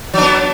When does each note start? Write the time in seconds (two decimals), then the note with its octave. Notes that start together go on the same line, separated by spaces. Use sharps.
0.14 F#3
0.18 D4
0.22 B3